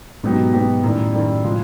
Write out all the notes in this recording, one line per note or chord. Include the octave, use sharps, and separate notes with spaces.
G#2 B2 F#3 B3 D#4 G4
B2 F#3 B3 D#4 G4
F#2 A2 D#3 G3
F#2 D#3 G3
C#3 F3 G#3